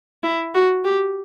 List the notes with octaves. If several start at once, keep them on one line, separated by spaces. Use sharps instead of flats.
E4
F#4
G4